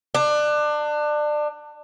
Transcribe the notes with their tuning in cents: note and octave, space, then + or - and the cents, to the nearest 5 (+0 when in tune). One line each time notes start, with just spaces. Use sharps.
D4 +25